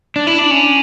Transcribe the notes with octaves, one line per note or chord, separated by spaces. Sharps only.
D4
E4
D4
C#4